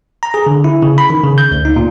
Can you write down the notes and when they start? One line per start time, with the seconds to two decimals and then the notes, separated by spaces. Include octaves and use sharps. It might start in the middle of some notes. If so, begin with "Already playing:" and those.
0.23 A#5
0.34 G#4
0.46 D3
0.64 E4
0.82 C#3
0.98 B5
1.10 D#3
1.24 C#3
1.38 G6
1.51 D2
1.65 D#4
1.76 A#2